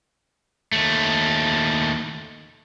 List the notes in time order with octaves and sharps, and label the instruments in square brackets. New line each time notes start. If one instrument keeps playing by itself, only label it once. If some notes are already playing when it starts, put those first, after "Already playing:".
[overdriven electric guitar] D#2 A3